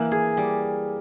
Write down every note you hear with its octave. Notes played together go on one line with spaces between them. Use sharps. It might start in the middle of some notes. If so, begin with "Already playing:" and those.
Already playing: E3 A#3
G#4
G3